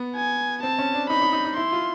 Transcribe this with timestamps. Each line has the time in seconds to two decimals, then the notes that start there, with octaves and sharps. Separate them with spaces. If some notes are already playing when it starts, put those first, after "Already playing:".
Already playing: B3
0.16 G#5
0.63 C4 A5
0.79 C#4
0.94 D4
1.10 D#4 B5
1.22 D#4
1.33 D#4
1.45 D#4
1.57 E4 C6
1.72 F4